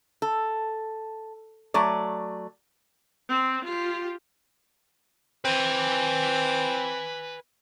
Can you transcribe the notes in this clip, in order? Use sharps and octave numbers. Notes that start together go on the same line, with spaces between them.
A4
F#3 A3 D5
C4
F4 G4
C4 B4 G#5